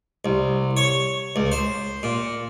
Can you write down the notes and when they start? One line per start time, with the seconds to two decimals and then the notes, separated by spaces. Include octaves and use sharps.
0.25 C2
0.77 C#5
1.36 C#2
1.52 C5
2.03 A#2